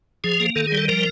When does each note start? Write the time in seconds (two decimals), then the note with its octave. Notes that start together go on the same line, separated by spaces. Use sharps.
0.24 F3 G#4
0.40 A#3
0.56 D#3 A4
0.67 G#4
0.72 G3
0.78 A4
0.88 F3 A#4